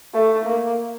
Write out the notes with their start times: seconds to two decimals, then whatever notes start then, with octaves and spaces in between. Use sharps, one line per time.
0.14 A3
0.45 A#3